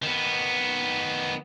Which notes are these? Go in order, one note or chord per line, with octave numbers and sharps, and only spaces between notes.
D#3 B3